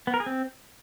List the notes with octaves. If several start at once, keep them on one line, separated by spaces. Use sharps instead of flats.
B3
A#4
G#4
C4